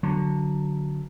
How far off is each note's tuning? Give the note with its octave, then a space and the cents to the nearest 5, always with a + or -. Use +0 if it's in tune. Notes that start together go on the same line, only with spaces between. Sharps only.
D3 +0 F#3 +0